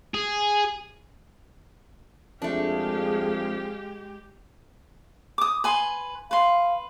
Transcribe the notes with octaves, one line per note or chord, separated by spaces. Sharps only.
G#4
F2 G#3 A3 D4 G4 G#4 F5
D6 D#6
B4 G#5 C6
B4 F5 C6